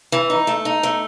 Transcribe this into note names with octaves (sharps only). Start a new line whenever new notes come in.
E3
D#4
A3
D#4
A3